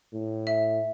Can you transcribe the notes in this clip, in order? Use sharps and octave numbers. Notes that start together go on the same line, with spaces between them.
A2
E5